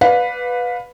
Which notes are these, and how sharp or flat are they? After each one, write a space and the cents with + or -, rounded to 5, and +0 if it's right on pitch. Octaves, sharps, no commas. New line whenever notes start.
B4 +0 D5 +0 F5 +35